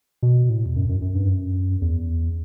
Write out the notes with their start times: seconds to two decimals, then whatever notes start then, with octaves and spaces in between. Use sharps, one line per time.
0.23 B2
0.49 A2
0.66 E2
0.76 F#2
0.89 F#2
1.01 F#2
1.15 G2
1.29 F#2
1.82 E2